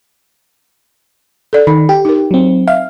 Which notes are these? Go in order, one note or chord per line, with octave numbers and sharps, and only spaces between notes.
A4 D5
D#3 B5
G4 G5
D#4 A#4
F#3 C4
E5 F5